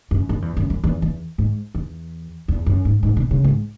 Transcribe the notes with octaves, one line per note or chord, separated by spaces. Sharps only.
F#2
F#2
E2
F#2
F#2
E2
E2
G#2
E2
E2
F#2
G#2
G#2
B2
C#3
G#2